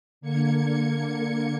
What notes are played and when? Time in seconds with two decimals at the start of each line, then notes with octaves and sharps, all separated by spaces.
0.21 D3 A#3 G#6 C#7